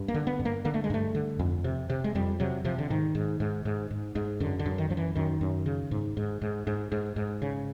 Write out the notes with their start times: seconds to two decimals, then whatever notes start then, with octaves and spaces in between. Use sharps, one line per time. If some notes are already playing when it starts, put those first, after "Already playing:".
Already playing: G2
0.08 A#3
0.14 D3
0.27 B3
0.39 G2
0.45 A#3
0.65 D3 A#3
0.74 A3
0.84 G#3
0.90 G2 A3
1.15 D3
1.39 F2
1.64 C3
1.90 C3
2.04 G#3
2.15 F2 G3
2.40 C3 F#3
2.65 C3 F3
2.78 D3
2.90 G#2 D#3
3.15 G#2
3.40 G#2
3.65 G#2
3.91 G#2
4.15 G#2
4.40 F#2 D3
4.59 D3
4.66 F#2
4.78 D#3
4.90 F#2 F3
4.97 E3
5.15 F#2 D#3
5.41 F#2
5.66 C#3
5.91 G#2
6.17 G#2
6.42 G#2
6.67 G#2
6.92 G#2
7.16 G#2
7.42 C#3